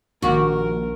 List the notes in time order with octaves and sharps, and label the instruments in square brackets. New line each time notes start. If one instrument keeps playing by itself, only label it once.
[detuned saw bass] A#1 [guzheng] D#3 G4 [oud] F#4 [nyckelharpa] A#4